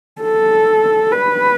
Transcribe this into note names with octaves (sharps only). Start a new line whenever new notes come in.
A4
B4